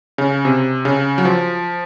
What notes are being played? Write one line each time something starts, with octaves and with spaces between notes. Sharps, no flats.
C#3
C3
C#3
F#3
F3